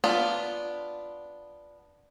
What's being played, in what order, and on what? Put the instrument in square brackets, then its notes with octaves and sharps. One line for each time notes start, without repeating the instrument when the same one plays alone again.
[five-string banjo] B3 D4 F4